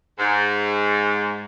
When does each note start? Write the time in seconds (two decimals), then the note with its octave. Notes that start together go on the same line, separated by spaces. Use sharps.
0.19 G#2